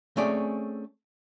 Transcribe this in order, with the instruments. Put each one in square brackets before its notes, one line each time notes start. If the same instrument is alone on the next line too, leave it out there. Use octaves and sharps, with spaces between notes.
[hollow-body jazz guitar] A3 C4 C#4 G#4 D5